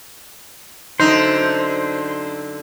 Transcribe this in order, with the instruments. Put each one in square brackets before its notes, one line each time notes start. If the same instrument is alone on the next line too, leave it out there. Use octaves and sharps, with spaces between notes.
[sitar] F#2 D3 D#4 [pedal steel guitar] C5